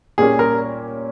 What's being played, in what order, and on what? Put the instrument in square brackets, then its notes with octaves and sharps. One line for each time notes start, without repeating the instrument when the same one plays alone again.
[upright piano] A#2 G3 A#3 C#4 G4 [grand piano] G#4
[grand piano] A#4